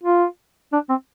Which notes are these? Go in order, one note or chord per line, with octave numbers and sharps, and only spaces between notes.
F4
D4
C4